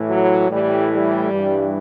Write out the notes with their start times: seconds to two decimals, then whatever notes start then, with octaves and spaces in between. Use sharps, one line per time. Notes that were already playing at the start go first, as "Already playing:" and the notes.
Already playing: A2 E3
0.09 F#3
0.50 A2 E3 G3
0.90 G3
1.31 G2 E3